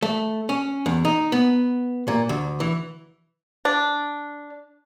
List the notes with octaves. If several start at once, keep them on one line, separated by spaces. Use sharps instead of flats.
A3
C#4
E2
D#4
B3
A#2
D2
E3
D4